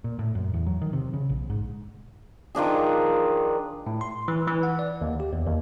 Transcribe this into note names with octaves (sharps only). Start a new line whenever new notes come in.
A#2
A2
F#2
E2
F#3
D#3
C3
C#3
A#1
G#2
D#3 F3 D4 G#4
A2
C6
E3
E3
F#5
D5
D#2
G4
E2
D#2